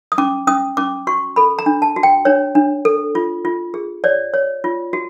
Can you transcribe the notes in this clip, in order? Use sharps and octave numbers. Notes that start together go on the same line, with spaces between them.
D#6
C#4 D6
C#4 D#6
C#4 D6
F#4 C#6
A4 B5
A#5
D4
A5
F#4
G5
D4 C#5
D4
A4
F4
F4
G#4
C#5 D5
C#5
F4
F#4